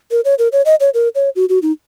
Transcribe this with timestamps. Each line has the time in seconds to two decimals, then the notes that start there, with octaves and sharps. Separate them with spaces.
0.11 A#4
0.25 C#5
0.39 A#4
0.52 C#5
0.66 D#5
0.80 C#5
0.94 A#4
1.15 C#5
1.36 F#4
1.49 F#4
1.62 D#4